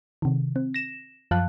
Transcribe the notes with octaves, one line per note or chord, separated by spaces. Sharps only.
C3 D#3
C4
A#6 E7
F#2 F3 F5 A5 F#6